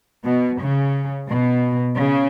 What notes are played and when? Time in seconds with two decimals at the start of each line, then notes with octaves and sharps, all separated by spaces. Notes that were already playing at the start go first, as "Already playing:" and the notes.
0.26 B2
0.61 C#3
1.30 B2
1.98 C#3